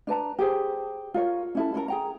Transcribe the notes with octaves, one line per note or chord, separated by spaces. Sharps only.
D4 B4 A5 A#5
G4 G#4 C5
F4 A#4 C#5
C#4 E4 A4
C#4 A4 A#4 A#5
G#4 G5 A#5